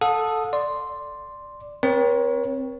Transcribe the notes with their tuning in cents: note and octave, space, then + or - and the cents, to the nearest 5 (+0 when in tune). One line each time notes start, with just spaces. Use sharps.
A4 +0 F#5 -40 D#6 +0
D5 +0 C6 +0
C4 +0 A#4 +45 C#5 +0